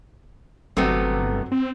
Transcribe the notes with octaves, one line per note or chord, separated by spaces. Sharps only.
G1 C3 F#3 A3 B3 C4
C4